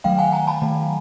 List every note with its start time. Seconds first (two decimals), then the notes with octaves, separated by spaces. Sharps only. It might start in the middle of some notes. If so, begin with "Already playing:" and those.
0.04 D#3 F#3 A3 F5 G5
0.18 F#5 G#5
0.33 G#5 A#5
0.47 A5 B5
0.62 D#3 F#3 A3